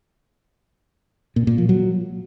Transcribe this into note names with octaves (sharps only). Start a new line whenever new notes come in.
A#2
A#2
F3
F#3